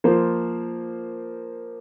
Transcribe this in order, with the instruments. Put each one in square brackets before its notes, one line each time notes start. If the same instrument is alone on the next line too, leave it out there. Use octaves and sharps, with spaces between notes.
[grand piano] F3 A#3 F4 C5